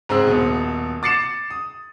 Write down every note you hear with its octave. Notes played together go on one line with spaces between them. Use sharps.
G#2 C4 G#4 E6
D#1 B2
D6 A6 C7 C#7 E7
D#6